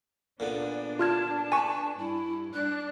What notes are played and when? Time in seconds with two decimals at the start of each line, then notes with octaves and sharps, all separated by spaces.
0.40 A#2 D3 B3 D4
0.99 F4 A5 F6 G#6
1.52 B4 G#5 C#6
1.98 G2 E4
2.54 D4 F#6